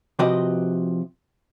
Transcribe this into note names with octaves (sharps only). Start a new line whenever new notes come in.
C3 F3 F#4 G4 B4 D#5